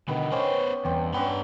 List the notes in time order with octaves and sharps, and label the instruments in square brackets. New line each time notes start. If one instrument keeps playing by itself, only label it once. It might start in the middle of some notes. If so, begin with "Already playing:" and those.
[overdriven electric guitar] B2 D3 [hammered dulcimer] D#3 B3 B4
[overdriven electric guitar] B3 C5 [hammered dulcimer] C#4 G4 C#5
[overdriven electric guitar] E2 [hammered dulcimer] G2 C4 G4
[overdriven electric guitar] G2 C6 [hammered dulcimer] B3 C#4 D4